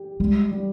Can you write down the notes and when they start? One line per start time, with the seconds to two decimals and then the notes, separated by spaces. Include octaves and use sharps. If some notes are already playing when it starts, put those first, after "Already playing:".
Already playing: G4
0.19 G3 G#3
0.51 G3